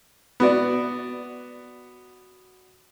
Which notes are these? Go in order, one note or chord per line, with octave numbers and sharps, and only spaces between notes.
B3 F#4 D5